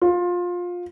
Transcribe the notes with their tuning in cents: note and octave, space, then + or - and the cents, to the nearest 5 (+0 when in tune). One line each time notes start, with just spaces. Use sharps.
F4 +20